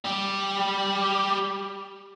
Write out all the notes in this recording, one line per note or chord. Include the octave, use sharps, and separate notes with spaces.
G3 G4